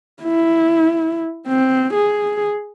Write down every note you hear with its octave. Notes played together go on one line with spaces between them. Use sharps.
E4
C4
G#4